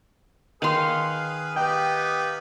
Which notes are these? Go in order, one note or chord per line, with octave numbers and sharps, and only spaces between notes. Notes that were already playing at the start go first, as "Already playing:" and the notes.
D#3 G#4 B4 F5 C6
B3 D#4 G4 G5